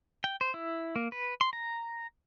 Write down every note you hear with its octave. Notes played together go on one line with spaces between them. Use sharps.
G5
C5
E4
A#3
B4
C6
A#5